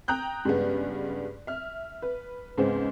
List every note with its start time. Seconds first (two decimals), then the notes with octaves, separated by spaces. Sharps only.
0.08 G5 A#5 D#6 F#6 G6
0.45 G2 C#3 G#3 B3
1.47 E5 F6
2.02 B4
2.58 G#2 C#3 G#3 B3 C4